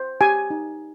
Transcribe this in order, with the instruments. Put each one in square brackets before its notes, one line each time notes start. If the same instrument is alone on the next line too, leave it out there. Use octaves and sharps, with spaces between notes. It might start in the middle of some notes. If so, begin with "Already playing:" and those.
Already playing: [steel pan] C5
G4 G#5
D#4